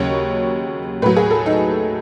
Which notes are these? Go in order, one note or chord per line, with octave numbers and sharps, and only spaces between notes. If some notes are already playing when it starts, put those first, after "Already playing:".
Already playing: D#2 C#3 F#3 C#5
A2 F#3 B4
G#4
A4
D#4